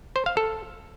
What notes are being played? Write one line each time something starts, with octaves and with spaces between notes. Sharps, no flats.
C5
F5
A4